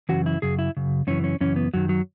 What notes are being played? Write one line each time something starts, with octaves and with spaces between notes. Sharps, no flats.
F#2 C#3 E3 F#4
E4
F#2 C#3 G#4
E4
F#2 C#3
F#2 C#3 E3 C#4
C#4
F#2 C#3 E3 C#4
B3
F#2 D#3 F#3
F#3